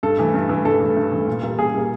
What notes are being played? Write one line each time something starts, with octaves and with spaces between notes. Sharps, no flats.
G2 A4
E3 A3
G2
E3 A3
G2 A4
E3 A3
G2
E3 A3
A#2
G3 A#3
A#2 G#4
G3 A#3